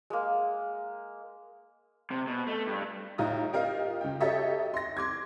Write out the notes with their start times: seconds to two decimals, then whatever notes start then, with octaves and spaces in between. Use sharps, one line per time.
0.10 G#3 A#3
2.11 C3
2.27 B2
2.47 A3
2.67 G2
3.18 A2 D#4 F4 A#5 D#6
3.53 F4 G4 A#4 D#5 F5
4.01 C#2 G5
4.21 F#4 G4 A4 C#5 D#5 E5
4.74 C6 A#6
4.97 C6 D6 G#6